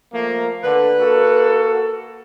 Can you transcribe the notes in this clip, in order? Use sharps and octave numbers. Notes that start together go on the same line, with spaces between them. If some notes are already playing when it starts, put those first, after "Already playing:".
F3 A3 A#3
D3 B4
A#3 F#4 A4